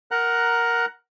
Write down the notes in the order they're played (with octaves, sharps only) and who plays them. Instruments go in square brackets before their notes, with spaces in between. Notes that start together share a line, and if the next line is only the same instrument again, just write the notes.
[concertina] A#4 F#5 A#5 F#6